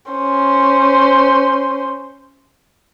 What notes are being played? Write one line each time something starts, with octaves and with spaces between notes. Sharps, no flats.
C#4 C5